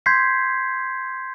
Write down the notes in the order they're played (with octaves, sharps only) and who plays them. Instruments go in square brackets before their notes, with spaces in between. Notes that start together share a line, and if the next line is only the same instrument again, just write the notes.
[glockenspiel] C6 G6 G#6 B6 C7